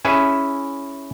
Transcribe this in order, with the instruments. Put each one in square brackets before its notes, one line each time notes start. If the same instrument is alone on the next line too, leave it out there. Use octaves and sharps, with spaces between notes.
[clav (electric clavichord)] C#4 E4 G#4 B4 E5